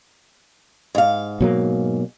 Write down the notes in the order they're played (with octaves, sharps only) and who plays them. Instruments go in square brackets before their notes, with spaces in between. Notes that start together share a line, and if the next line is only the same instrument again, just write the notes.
[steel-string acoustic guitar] G#2 F5
[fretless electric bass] B2 F#3 A#3